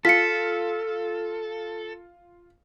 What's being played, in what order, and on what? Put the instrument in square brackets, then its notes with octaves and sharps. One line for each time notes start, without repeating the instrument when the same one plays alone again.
[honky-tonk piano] F4 [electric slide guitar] A4 [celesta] B6 C#7